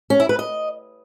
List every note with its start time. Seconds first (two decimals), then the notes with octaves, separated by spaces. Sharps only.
0.10 C#4
0.20 E4
0.29 B4
0.39 D#5